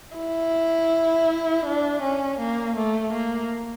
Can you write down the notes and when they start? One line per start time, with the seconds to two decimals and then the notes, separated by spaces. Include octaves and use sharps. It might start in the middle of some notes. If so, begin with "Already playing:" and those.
0.17 E4
1.66 D4
2.02 C#4
2.40 A#3
2.76 A3
3.13 A#3